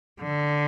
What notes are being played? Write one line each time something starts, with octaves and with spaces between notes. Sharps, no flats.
D3